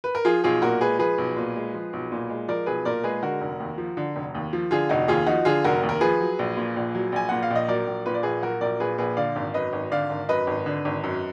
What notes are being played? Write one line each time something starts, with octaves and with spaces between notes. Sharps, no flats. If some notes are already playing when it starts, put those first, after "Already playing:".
B4
A#4
F3 F4 G#4
B1 F4 G#4
A#2 F#4 A#4
G#3 G#4 B4
F3 G#4 B4
B1
A#2
G#3
F3
B1
A#2
G#3
F3 A#4 D5
B1 G#4 B4
A#2 A#4 D5
G#3 G#4 B4
D3 F#4 A#4
F1
D#2
F3
D3
F1
D#2
F3
D3 F4 G#4
F1 D#4 F#4
D#2 F4 G#4
F3 D#4 F#4
D3 F4 G#4
F1 F#4 A#4
D#2
A#4
F3 G#4 B4
F#3
A#1
A#2
A#1
F#3
A#1 G#5
A#2 F#5
F5
A#1
D#5
F#3 A#4 D5
A#1
A#2 B4
D5
A#1 G#4 B4
F#3 F#4 A#4
A#1 A#4 D5
A#2 G#4 B4
A#1 G#4 B4
D3 D5 F5
G#1
F#2 B4 D#5
G#1
D3 D5 F5
G#1
F#2 B4 D#5
G#1
D3
G#1
F#2